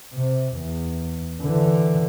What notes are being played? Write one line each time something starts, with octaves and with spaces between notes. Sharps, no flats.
C3
E2
D3 E3